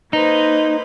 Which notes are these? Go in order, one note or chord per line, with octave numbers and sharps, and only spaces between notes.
A#3 D#4 B4 C5